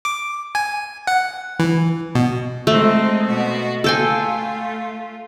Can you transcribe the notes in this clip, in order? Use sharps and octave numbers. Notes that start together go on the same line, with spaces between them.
D6
G#5
F#5
E3
B2
G#3 A3 C4 D#4
B2 F#4
A3 F4 A4 G5 G#5